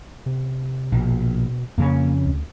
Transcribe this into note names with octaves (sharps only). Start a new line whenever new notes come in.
C3
A#1 B2
F2 C#3 A#3 C#4
D2